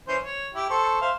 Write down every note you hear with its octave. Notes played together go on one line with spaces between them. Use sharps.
E3 C#4 C5
C#5
E4 G4
A4 C5 C#6
C5 E5 F5